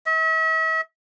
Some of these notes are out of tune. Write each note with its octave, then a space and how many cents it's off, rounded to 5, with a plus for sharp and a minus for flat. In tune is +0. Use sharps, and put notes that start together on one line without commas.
E5 -40